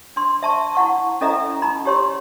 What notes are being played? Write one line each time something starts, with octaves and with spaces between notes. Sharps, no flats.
D4 C6
E5 A5 C#6
E4 F#5 C#6
C#4 E4 A4 D#5 E5 A#5
D#4 A#5 B5
G4 C#5 C6